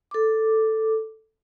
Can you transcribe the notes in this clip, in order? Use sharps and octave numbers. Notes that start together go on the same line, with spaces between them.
A4 D6